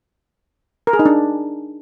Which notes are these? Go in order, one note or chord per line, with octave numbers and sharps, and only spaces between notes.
A#4
G#4
D#4
D4